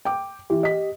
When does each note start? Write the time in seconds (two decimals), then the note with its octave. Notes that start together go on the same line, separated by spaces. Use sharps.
0.05 G5 D6
0.50 E3 G4
0.63 D#5 B6